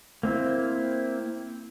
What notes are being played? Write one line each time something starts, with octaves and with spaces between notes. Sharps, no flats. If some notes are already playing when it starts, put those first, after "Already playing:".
A#3 C4 E4